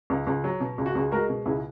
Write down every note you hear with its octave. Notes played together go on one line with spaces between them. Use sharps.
C#2
C#2
F#3
B2
C#2
F#4
C#2 G#4
G#3 F#4 A#4
B2
C#2 E4 G#4